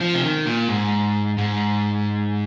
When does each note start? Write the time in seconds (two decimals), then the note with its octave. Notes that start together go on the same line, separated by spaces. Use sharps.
0.01 F3
0.14 C3
0.23 D#3
0.47 A#2
0.69 G#2
1.38 G#2